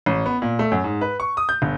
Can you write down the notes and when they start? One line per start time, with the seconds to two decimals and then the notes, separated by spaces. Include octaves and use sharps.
0.06 A1
0.26 B3
0.42 A#2
0.59 A3
0.72 F#2
0.84 G#2
1.01 B4
1.20 C#6
1.37 D#6
1.49 G6
1.62 G1